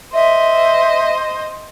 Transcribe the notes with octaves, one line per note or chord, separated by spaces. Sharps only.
C5 D#5 E5